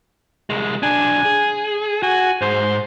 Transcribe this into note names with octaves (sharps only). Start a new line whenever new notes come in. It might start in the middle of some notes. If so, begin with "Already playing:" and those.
C2 G#3
B1 D4 G#5
G#4
F#4 G#5
G#2 C5